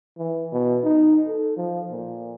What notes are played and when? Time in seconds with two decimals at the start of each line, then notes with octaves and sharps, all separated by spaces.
0.18 E3
0.52 B2
0.84 D#4
1.27 A4
1.57 F3
1.91 A#2